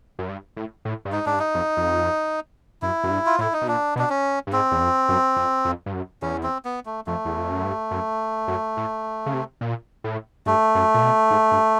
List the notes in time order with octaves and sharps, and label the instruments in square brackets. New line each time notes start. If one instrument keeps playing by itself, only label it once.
[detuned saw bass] F#2
G2
A2
A2
G2
[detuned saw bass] G#2 [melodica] D#4
[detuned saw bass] G#2 [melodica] D4
[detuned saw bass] G2
[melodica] D#4
[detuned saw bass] F2
F2
[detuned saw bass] F#2 [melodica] E4
[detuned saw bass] F#2
G2
[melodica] F4
[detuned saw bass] A2 [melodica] E4
[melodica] D#4
[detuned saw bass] B2
[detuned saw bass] A#2 [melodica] D4
[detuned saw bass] B2 [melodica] D4
[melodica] C#4
[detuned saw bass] G2
[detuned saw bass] G#2 [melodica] C4
[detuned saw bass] E2
F2
F#2
F2
F2
G2
F#2
[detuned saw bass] E2 [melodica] C#4
[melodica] C4
B3
A3
[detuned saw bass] F2 [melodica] A3
[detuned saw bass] E2
F2
F#2
G2
F#2
F#2
A2
C#3
C3
A#2
A2
[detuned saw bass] G2 [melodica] A3
[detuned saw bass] F#2
A#2
B2
G#2
G2